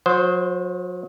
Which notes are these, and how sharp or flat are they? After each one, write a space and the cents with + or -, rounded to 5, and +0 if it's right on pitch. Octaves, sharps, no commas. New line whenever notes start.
F#3 -40 C5 -5